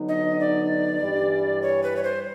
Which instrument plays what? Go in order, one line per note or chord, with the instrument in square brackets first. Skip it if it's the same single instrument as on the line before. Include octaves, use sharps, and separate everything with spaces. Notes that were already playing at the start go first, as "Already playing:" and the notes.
Already playing: [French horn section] D3 F#3 B3 D#4
[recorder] D#5
D5
[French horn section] G2 E3 G3
[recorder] C#5
B4
C#5
C5